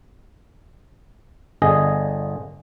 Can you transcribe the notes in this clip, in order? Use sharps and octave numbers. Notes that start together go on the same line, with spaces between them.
G1 D3 G#4 D#5 G#5